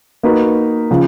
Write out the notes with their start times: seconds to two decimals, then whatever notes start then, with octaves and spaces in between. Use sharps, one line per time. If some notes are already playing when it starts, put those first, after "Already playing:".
0.23 A#3 D#4 F#4 B4
0.91 C#3 F3